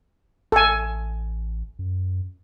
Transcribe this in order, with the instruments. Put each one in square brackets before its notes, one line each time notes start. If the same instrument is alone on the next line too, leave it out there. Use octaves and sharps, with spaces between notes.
[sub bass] A1 [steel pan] A4 G#5
[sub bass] F#2